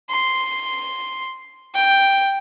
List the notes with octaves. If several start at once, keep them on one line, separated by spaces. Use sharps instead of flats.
C6
G5